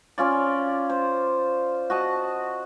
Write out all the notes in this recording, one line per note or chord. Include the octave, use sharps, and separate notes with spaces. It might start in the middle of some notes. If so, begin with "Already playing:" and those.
C#4 F4 D5
C5
F#4 D#5 A5